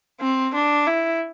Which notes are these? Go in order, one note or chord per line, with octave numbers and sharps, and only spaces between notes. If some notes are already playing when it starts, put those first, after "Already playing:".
C4
D4
E4